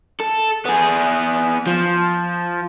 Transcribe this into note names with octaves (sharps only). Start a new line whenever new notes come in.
A4
B3 G#4
F3